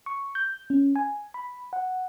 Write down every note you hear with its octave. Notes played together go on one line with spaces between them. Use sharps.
C#6
G6
C#4
G#5
B5
F#5